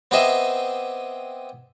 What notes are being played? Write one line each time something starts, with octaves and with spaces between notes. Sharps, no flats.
B3 C4 G4 G#4 D#5 E5